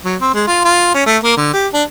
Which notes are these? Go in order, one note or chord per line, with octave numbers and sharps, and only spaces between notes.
F#3
C4
G#3
F4
F4
C#4
A3
A#3
D3
G4
D4